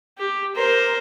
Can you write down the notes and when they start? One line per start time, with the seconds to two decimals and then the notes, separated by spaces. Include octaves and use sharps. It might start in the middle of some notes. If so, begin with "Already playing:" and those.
0.18 G4
0.55 A#4 C5